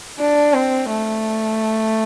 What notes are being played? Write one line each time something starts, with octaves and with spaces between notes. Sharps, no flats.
D4
C4
A3